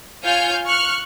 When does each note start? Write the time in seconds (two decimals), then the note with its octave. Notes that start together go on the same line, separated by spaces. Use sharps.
0.24 F4 C#5 F5 G#5 F6 G6
0.66 C#6 F6 F#6